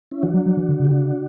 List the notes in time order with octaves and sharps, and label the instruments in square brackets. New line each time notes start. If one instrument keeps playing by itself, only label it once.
[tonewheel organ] C#4 E4
[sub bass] E3 [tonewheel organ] D4 F#4
[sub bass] F#3
F#3
E3
D3
C#3
[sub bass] D3 [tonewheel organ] G4
[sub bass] C#3 [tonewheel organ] D4 F#4